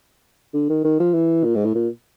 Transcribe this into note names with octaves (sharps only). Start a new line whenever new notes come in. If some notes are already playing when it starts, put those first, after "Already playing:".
D3
D#3
D#3
F3
E3
A#2
G#2
A2
A#2